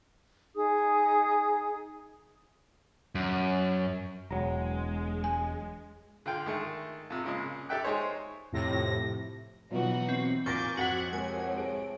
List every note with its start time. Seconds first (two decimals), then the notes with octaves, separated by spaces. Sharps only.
0.55 D#4 G#4 D#6
3.15 F#2
4.31 E1 F#3 G#3 A#5
5.24 G#5
6.26 D3 F4 G5
6.46 D#3 G#3 A3
7.10 F2 C3
7.24 A#2 C#3 G#3
7.69 G4 A4 D5 E5 G5 F#6
7.84 G#3 D#4 G#4 C5 C#5
8.52 F2 A2 C3 A#6
9.71 B2 E3 F#3 D#4 F4 F#4
10.09 C4
10.46 A#2 A#3 G#5 C#6 D6 G6 A6 A#6
10.77 F2 F#4 C5 F#5 F#6 G#6 B6
11.13 A2 C3 G#3 A#4 G#5
11.58 G#4 D7